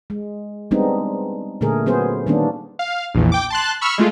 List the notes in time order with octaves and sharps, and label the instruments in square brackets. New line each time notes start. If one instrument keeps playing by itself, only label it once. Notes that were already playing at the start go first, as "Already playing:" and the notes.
[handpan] G#3
G3 G#3 B3 C4 D4 D#4
A#2 D3 A3 G#4 A#4
F#3 B3 C#4 G#4 C5
D#3 G3 A#3 B3 C#4 D4
[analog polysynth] F5
A#1 E2
G5 D6
A5 C6 F#6
B5 C#6 E6 F6
G#3 A3 F4